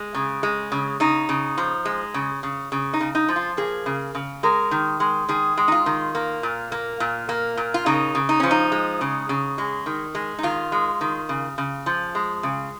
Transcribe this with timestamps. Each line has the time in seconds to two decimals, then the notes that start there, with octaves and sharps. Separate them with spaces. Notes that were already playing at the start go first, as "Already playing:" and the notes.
Already playing: G#3
0.14 C#3
0.43 G#3
0.72 C#3
1.00 C#3 D#4
1.29 C#3
1.58 F3
1.85 G#3
2.14 C#3
2.43 C#3
2.72 C#3
2.93 D#4
3.00 C#3
3.15 D#4
3.29 F3
3.36 F4
3.57 A#3 G#4
3.86 C#3
4.15 C#3
4.43 G#3 A#4
4.71 D#3
5.00 G#3
5.29 D#3 G#4
5.57 G#3
5.68 D#4
5.72 F4
5.86 D#3
6.15 A#3
6.43 A#2
6.72 A#3
7.00 A#2
7.29 A#3
7.57 A#2
7.74 F4
7.86 C#3 D#4
8.15 C#3
8.29 D#4
8.40 F3 C#4
8.51 D#4
8.72 G#3
9.01 C#3
9.29 C#3
9.58 G#3
9.86 D#3
10.15 G#3
10.38 D#4
10.43 D#3 F4
10.72 G#3
11.01 D#3
11.29 C#3
11.58 C#3
11.86 F3
12.15 G#3
12.43 C#3